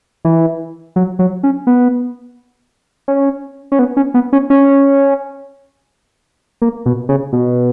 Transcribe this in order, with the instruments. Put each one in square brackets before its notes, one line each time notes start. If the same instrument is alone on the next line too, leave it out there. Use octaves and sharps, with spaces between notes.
[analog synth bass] E3
F#3
F#3
C#4
B3
C#4
C#4
B3
C#4
B3
C#4
C#4
A#3
B2
C#3
B2